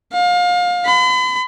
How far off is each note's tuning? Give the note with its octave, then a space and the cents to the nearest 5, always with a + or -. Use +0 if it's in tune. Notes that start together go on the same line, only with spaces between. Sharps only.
F5 +30
B5 +40